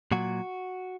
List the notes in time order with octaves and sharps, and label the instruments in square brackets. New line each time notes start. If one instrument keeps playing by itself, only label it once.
[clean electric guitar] A#2 F#3 F#4